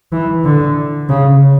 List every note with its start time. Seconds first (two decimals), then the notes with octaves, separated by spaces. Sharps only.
0.12 E3
0.44 D3
1.09 C#3